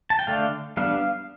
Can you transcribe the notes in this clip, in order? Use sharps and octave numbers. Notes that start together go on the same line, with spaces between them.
A5
G5
D3 A3 D4 F5
G3 B3 D4 F5